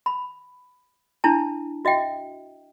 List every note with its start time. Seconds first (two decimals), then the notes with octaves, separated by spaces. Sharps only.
0.06 B5
1.24 D4 E4 A5
1.85 F#4 D#5 E5 G5